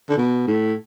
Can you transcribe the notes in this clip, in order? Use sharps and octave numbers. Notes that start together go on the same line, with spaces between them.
D3
B2
A2